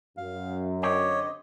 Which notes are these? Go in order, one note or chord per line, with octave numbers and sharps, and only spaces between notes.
F#2 F5
D3 C4 G4 C#5 D#5